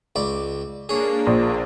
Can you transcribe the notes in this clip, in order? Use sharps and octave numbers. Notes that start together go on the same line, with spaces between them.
C#2 D5
A#3 D4 G#4 C#5
A#1